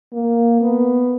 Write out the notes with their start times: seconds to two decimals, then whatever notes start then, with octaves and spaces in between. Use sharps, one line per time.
0.13 A#3
0.61 B3